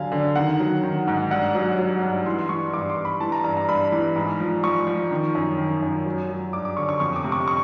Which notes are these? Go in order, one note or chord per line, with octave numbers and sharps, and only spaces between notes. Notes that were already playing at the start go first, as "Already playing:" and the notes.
Already playing: D#2 D3 F#3 F5 G#5
D3
D#3 F#5
F#3
D#3
G#2
G2 F#5
F#3
F#3
G2
E3 C6
C6
E3 C#6
G2 D6
C6
G2
B5
E3 A5
A#5
G2 A#5
A#5
G2 B5
E3
G#2
F3
F3 C#6
F3
D#3
F#2
D#3
F#2
F#3
F#3
G2 D6
D6
D3 C#6
C#6
F2 C#6
D6
C3
C#6
C#6